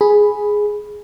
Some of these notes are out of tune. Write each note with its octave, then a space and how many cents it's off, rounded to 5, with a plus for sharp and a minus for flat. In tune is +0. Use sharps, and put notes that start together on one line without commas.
G#4 +0 B5 +0